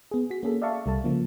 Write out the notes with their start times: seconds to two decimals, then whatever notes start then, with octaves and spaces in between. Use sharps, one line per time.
0.11 B3 G#4
0.30 F#4 B6
0.43 A#3 C#4 G#4 A4
0.62 D5 E5 F5 A5 C#6
0.86 C2 G3 A4 A5
1.04 C#3 F3 A#3